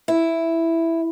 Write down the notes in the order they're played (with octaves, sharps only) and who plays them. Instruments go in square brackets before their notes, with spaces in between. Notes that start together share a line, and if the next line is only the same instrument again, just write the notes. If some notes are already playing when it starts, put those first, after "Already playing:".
[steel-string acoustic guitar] E4